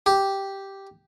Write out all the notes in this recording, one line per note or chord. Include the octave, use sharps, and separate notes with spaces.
G4